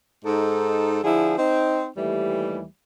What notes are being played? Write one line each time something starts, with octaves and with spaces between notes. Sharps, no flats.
G#2 D#4 A4
D3 F3 E4 G#4
C4 D#4
D#2 E3 G3 A3